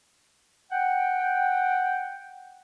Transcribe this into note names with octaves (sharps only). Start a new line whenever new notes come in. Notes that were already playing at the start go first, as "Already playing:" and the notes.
F#5 G5